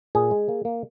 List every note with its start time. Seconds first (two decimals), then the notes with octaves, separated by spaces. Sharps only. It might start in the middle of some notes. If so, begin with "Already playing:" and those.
0.15 A#2 G#4
0.31 G#3
0.49 A#3
0.65 A#3